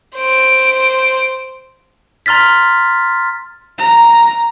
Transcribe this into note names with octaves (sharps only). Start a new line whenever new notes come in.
C5 D7
A#5 C6 F6 A6 B6
A#5